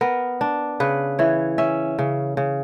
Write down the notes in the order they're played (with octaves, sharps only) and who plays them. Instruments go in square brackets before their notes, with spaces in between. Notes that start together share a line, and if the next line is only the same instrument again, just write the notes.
[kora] B3 A#4
D4
C#3 B4
E3 C#5
C#4 E5
C#3
C#3